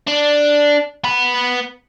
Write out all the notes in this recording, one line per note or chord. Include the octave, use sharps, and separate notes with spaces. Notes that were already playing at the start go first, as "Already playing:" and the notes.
D4
B3 B5